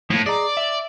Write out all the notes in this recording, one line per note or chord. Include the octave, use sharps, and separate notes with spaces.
A2 F3 A#3
G#4 D5 D#5 A#5
E5